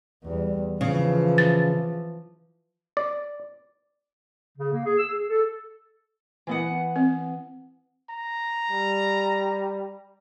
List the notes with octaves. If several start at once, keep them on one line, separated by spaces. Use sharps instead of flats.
E2 G3
C#3 E3 F3
A6
D5
C#3
A#3
G#4
E6
G#4
A4
E3 B3 F#5
C4
A#5
G3